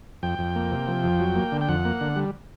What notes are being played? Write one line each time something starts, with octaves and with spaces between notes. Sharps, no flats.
F2 G5
F2
A#3
C3
F3
F2
F#3
A#3
D3
G5
F2 F#5
A#3
D3
G3